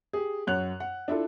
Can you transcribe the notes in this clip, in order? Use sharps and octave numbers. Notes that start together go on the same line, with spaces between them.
G4 G#4
F#2 C#5 F#5 F#6 F7
F#5
D4 E4 F4 A4